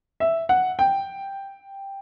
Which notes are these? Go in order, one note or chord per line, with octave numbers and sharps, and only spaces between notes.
E5
F#5
G5